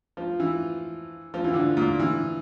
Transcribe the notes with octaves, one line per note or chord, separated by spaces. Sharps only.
F3
E3
F3
E3
D3
A#2
E3